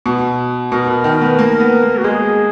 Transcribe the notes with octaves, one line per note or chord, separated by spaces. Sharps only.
B2
B2 A#4
B2
D#3
B3
A#3 A#4
B3
A#3
F#4
G#3 G#4